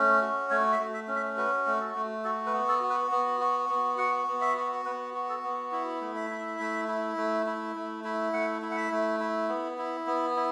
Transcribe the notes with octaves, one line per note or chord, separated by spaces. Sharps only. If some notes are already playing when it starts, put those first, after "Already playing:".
Already playing: A3 C#4
F#4
A3 C#5
E5
A3
E5
C#4
E5
F#4 B4
A3
A4
A3
F#4 A4
B4
B3
A4
F#4
B4
B3
F#4
B3
F#4 F#5
B3
E5
F#4
B3 B4
F#4
A4
B3
E4
A3
E5
E4
A3
E4
A3
E4
A3
E4
A3 F#5
E4
F#5
E5
A3
E4
B3
E4
B3
E4